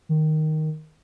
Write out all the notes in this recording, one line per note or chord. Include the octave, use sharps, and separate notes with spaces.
D#3